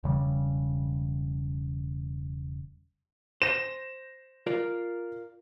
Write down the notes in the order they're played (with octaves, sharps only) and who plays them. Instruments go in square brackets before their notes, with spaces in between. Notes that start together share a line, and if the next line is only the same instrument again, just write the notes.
[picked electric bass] E1 C#3 G3
[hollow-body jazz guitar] C5 [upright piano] A#6 E7
[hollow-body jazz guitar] F4 A#4 D5